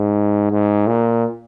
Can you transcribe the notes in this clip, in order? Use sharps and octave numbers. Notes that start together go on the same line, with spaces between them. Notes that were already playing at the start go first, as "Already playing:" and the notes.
Already playing: G#2
G#2
A#2